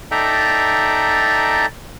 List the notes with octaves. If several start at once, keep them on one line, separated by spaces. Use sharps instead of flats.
D#4 A4 D5 E5 G5 A#5